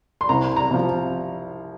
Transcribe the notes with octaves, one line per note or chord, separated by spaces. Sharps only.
C6
C2 A#5
A#5
C3 F3